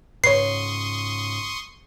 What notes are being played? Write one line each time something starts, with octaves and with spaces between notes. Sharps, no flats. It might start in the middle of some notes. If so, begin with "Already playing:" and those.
G#2 C#3 B4 C#5 C6 C#6 D#6 C7